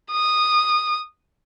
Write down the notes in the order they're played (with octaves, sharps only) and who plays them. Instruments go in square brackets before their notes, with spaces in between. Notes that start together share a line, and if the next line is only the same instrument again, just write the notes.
[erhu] D#6